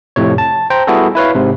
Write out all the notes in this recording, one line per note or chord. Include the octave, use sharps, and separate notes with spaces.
F2 A2 C3 C#5
A5
C5 G5 A#5
G3 B3 E4 F#4 G#4 A4
E4 B4 C#5 F5
G#2 C3